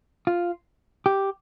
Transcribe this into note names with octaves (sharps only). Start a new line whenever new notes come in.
F4
G4